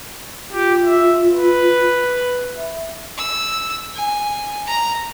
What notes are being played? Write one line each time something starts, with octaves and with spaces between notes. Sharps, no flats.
F4 G4
E5
B4
E5
E6
G#5
A#5